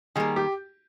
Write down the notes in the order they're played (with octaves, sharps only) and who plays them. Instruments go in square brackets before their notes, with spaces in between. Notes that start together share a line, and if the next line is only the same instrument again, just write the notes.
[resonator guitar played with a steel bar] D#3 G3 A#3 [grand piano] G#4
[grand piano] G4